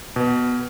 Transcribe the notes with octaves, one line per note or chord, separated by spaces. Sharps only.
B2